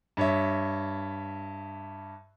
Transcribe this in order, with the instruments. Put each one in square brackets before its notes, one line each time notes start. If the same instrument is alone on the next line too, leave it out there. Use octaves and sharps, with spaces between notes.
[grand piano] G2 C#5 E5